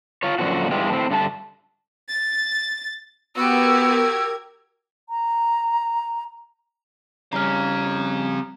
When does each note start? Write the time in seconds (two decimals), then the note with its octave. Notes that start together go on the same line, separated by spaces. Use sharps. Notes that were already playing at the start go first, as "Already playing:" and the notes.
0.23 F4 C#5
0.38 F#2 A#2 D3 F3 F#4
0.71 G2 B2 E3 G#3 F4 G4
0.89 A2 C4
1.11 G2 D3 A3 D4 A5
2.08 A6
3.36 B3 F#4 G4 A#4 E6 G#6
5.09 A#5
7.33 C#3 G3 C4 C#4 F5 A#5 F6